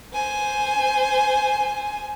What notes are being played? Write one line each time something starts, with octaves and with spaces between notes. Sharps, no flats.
C5 G#5